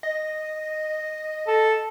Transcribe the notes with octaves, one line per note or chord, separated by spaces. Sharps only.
D#5
A4